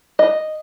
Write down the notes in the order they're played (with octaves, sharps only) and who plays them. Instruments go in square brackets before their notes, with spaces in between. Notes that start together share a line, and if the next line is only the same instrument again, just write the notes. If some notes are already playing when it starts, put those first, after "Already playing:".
[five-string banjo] D#5